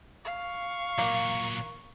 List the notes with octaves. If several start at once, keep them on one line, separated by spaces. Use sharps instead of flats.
F5 C#6
A#2 F#3 A#3